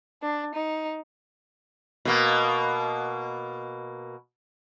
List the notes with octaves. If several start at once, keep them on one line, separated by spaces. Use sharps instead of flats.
D4
D#4
B2 A#3